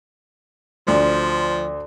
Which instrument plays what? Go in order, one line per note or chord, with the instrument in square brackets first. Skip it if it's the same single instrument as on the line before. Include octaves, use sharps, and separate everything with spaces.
[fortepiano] D2 [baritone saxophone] F3